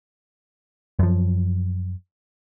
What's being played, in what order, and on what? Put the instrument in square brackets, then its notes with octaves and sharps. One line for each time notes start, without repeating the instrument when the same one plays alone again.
[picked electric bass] F#2 F3